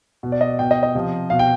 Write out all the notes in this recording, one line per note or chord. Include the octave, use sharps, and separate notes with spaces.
B2
D5
D#5
B2 G5
D#5
D#5
C3 F3
B2 F5
G5